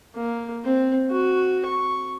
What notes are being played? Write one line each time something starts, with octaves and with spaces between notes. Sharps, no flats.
A#3
C4
F#4
C#6